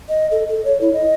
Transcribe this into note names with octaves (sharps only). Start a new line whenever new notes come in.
D#5
A4
A4
C#5
E4
D#5